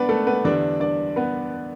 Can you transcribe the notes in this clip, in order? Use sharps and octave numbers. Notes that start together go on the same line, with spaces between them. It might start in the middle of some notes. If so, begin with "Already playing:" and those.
Already playing: B3 D4 B4 D5
A3 A4
B3 B4
E2 D3 G3 D4 D5
D4 D5
B3 B4